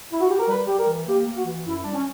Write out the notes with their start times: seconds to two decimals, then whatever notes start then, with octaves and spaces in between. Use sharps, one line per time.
0.12 E4
0.20 F#4
0.30 G4
0.39 A#4
0.48 G3 B4
0.66 G3 G4
0.78 A#4
0.88 E3
1.07 A#3 G4
1.27 A#3
1.36 F#4
1.45 E3
1.65 F#2 E4
1.83 G3 D4
1.94 C#4